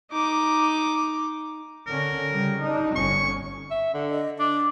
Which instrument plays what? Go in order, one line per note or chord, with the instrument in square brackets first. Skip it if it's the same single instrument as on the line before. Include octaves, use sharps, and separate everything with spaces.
[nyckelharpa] D#4 D6
[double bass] D3 C#4 [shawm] A#4
[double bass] C#3 G3
D4 D#4
[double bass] G1 C#4 [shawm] C#6
[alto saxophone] E5
D3
[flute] D#5
[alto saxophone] D4 [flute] D6